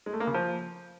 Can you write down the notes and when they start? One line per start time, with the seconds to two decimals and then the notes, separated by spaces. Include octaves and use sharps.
0.06 G#3
0.13 A3
0.20 A#3
0.27 C#3
0.34 F3